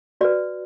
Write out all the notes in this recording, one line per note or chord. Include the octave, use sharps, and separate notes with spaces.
F#4 B4 D5